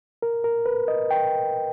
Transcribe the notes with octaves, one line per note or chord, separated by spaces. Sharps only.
A#4
A#4
B4
D#5
G5